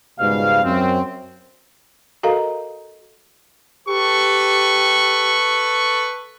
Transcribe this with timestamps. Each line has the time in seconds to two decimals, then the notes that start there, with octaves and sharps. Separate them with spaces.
0.20 C#2 G#2 B2 G3 F5
0.64 F#2 C4
2.23 F#4 A4 A#4 D#5 F5 A#5
3.88 G4 A4 B4 C#6